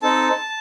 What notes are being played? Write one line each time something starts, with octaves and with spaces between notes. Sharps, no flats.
C4 D#4 A4 A5